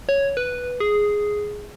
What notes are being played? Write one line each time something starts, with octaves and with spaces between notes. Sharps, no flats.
C#5
B4
G#4